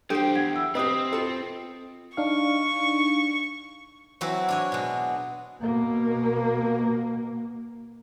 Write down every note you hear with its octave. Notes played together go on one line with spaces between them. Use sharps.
F#3 D4 G4 A4 C5 G5
E2 F#5 G#6 D7
E6
C4 G4 B4 D#5 D#6
F4 A4
D4 D#4 F5 C#6
E3 F#3 C4 E4 F#4
D4 C#5 G#5
B2 G#3
B2 A#3